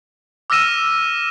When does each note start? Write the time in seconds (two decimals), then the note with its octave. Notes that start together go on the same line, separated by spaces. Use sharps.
0.50 D6 E6 F6 A#6 D#7 E7